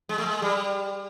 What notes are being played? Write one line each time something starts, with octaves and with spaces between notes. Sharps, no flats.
G#3
A3
G#3
G3